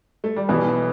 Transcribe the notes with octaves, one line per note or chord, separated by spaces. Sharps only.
A3
G3
B1 B2 E3 B3